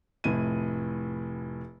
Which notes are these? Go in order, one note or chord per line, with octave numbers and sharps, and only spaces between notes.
F1 A2 E4 D#7